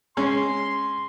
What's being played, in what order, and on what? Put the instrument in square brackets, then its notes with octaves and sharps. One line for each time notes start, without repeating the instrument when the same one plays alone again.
[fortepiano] G#3 C#4 [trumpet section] C6